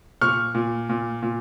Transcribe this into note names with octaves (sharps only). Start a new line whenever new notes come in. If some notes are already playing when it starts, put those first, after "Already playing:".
A#2 C#6 F6
A#2
A#2
A#2